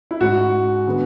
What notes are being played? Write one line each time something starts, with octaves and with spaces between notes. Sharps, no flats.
E4
G#2 G#3 C#4 F#4
D3 G#3 B3